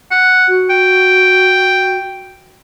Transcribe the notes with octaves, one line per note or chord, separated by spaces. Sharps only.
F#5
F#4
G5